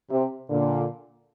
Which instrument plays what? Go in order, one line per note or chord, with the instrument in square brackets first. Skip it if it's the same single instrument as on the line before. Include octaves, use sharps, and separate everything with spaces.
[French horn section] C3
A#2 D3